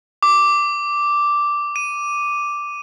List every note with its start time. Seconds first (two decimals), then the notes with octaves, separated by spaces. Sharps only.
0.23 D6
1.76 D#7